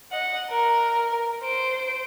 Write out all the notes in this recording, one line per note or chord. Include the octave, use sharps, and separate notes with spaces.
D#5 F#5
A#4
C5 D7